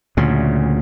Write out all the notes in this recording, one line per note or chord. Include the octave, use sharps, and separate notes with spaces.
D2 A#2 C#3